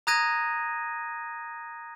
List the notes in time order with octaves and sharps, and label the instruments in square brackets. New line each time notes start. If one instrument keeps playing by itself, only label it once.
[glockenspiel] A#5 D#6 F#6 G#6 A#6 D#7